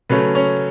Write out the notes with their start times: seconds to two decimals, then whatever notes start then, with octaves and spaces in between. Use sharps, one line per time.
0.09 C#3 F#3 A3 C#4 B4
0.35 C#4 C#5